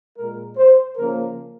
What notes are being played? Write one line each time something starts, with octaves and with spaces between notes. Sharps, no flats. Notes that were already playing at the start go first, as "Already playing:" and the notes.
A#2 G#3 A#4
C5
C#3 F3 A#3 A#4